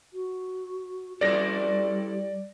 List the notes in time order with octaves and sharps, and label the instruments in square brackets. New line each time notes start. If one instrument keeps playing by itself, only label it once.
[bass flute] F#4
[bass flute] G3 [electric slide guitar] E4 G4 A4 [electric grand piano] D5 A#6